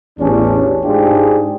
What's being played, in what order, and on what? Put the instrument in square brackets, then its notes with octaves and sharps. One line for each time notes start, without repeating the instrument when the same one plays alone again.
[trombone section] A1 E2 C#4 D4
G#2 D4 F4 G4 G#4